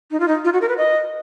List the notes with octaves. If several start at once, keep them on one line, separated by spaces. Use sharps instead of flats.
D#4
F4
D#4
F4
F#4
A#4
B4
D#5